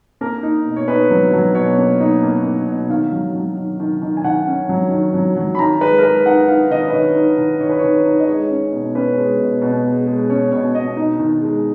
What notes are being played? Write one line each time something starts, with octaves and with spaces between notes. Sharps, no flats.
A#3 A#4
D#4
B2
C#5
D#4 B4
F#3
F#3
B2 C#5
A#3
D#4
A#3
A#3
B2
D#3 F5
F#3
F#3
D#3
D#3
D#3
G#5
D#3 F#5
C#4
F#3
D#3
F#3
F#3
B5
D#3 A#5
G#3 B4
A#4
G#3 B4
D#4 F#5
D#4 F5
D#3 D#5
B4
D#3 C#5
D#4
D#3
D#3 C#5
B4
D#3 C#5
D#4
D#5
G#3 C#5
C#4
B2
C#4 B4
G#3
B2
B2
G#3
G#3
C#4 C#5
B2 C#5
B2 D#5
D#4
D#3
G#3